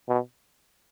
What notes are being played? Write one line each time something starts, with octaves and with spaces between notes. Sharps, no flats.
B2